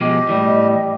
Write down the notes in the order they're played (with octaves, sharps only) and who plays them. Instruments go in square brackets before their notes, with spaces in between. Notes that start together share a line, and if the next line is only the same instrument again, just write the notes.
[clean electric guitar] B2 F3 G#3 [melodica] G4 [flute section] D#5
[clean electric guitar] A2 E3 [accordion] G3